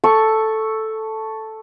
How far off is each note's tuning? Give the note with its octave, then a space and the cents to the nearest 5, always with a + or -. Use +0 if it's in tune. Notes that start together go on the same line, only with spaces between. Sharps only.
A4 +0 C#6 +0